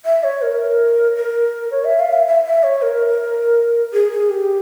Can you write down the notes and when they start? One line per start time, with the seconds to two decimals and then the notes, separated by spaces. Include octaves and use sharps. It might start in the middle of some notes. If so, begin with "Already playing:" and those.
0.05 E5
0.24 C#5
0.42 A#4
1.16 A#4
1.71 C#5
1.85 E5
2.00 F5
2.13 E5
2.27 E5
2.45 E5
2.63 C#5
2.82 A#4
3.93 G#4
4.12 G#4
4.30 G4